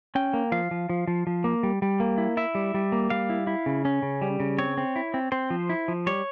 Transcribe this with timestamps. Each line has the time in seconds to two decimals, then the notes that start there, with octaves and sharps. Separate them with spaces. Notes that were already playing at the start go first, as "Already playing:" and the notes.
0.15 C#4 G5
0.34 A#3
0.52 F3 F5
0.71 F3
0.89 F3
1.08 F3
1.27 F3
1.44 A#3
1.63 G3
1.82 G3
2.00 A#3
2.18 E4
2.37 E4 E5
2.55 G3
2.74 G3
2.92 A#3
3.10 G3 F5
3.30 E4
3.47 E4
3.66 C#3
3.85 C#4
4.02 C#3
4.22 G3
4.40 C#3
4.58 C4 C#5
4.78 C4
4.96 E4
5.14 C4
5.32 C4 C5
5.50 F3
5.70 E4
5.88 F3
6.07 G3 C#5